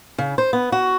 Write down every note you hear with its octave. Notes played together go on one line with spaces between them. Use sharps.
C#3
C5
B3
F#4